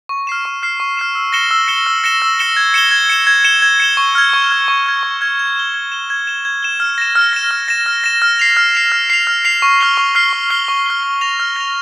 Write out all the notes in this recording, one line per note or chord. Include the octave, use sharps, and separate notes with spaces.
C#6
F6 C7 E7
C#6
F6 C7 E7
C#6
F6 C7 E7
E6
A#6 C#7 E7 G7
E6
A#6 C#7 E7 G7
E6
A#6 C#7 E7 G7
E6
A#6 C#7 E7 G7
G#6
C#7 E7 G7
G#6
C#7 E7 G7
G#6
C#7 E7 G7
G#6
C#7 E7 G7
C#6
F6 G#6
C#6
F6 G#6
C#6
F6 G#6
C#6
F6 G#6
G#6
E7 G7
G#6
E7 G7
G#6
E7 G7
G#6
E7 G7
F6
A#6 E7
F6
A#6 E7
F6
A#6 E7
F6
A#6 E7
F6
C7 F7
F6
C7 F7
F6
C7 F7
F6
C7 F7
C#6
F6 C7 G7
C#6
F6 C7 G7
C#6
F6 C7 G7
C#6
F6 C7 G7
F6
A#6 F7
F6
A#6 F7